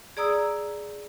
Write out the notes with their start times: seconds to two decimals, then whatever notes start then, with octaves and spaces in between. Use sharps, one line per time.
0.17 G#4 D5 A#5 D#6 E6